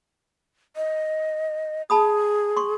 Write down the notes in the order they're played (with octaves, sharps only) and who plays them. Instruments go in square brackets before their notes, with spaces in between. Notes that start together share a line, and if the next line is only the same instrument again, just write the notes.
[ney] D#5
[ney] G#4 [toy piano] A5 B5 D#6
[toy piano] C6 C#6